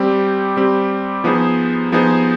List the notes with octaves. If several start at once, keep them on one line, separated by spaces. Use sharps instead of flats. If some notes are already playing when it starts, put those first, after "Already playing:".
Already playing: G3 C4 G4
G3 C4 G4
F3 B3 D#4 G#4 C5
F3 B3 D#4 G#4 C5